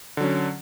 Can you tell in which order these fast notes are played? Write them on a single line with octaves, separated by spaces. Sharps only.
D3 F#3 C#4